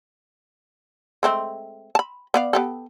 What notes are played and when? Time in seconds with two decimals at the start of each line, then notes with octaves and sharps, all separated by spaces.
1.23 G#3 A3 C4
1.95 A5 B5
2.34 B3 D5 F5
2.53 B3 G4 A4